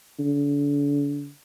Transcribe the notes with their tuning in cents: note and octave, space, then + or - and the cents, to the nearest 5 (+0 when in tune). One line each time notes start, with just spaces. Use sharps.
D3 -40